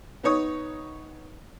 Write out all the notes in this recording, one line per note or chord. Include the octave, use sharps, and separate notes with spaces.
B3 D#4 C#5 D#6